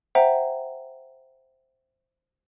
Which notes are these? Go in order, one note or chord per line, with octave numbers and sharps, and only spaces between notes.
C5 E5 F#5 G5 A#5